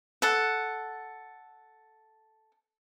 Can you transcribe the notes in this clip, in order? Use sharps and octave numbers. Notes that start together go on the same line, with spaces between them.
A4 F#5